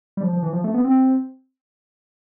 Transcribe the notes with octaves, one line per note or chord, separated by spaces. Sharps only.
G3
F3
F3
E3
F3
A3
B3
C4